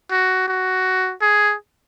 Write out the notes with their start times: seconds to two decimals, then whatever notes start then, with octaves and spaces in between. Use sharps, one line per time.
0.11 F#4
0.48 F#4
1.22 G#4